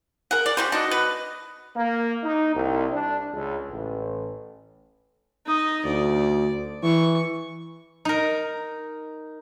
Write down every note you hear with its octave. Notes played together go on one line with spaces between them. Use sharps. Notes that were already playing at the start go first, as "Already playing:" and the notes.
G#4 A#4 F#5
D5
C#3 G3 F#4 C5
D4 D#4 F#4 D#5
B3 B4
A#3
D#4
C2
D4
C#2
A1
D#4 D#5
D2 D5
E3 C#6
D#4 A#4